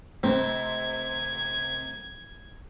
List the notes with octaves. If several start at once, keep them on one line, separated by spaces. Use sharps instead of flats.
C3 A3 C4 G#6